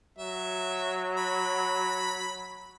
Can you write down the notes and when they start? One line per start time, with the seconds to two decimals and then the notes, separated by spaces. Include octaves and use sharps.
0.19 F#3 E5
1.17 B5